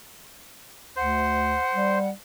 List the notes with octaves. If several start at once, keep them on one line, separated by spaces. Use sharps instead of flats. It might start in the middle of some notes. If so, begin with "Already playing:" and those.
D2 C5 F#5
G3